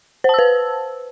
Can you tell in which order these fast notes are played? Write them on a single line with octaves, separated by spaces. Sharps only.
C5 A5 E6 B4